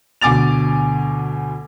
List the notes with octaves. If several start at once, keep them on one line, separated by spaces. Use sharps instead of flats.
D2 B2 G#5 D6 A6 F7